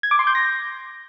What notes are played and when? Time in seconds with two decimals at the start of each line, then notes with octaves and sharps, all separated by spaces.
0.03 G#6
0.11 D6
0.19 C6
0.27 G6
0.35 A#6